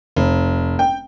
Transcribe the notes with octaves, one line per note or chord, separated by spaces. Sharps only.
F1
G5